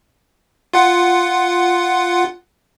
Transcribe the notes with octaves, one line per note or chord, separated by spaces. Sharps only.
F4 F#5